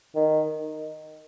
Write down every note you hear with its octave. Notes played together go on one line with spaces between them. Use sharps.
D#3